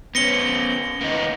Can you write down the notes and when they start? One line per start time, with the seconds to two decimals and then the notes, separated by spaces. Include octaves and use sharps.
0.15 B3 C#4 A#6 C#7 G7
1.01 A#3 B3 D#4